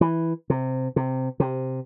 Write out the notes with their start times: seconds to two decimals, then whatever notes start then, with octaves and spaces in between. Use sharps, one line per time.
0.01 E3
0.50 C3
0.96 C3
1.40 C3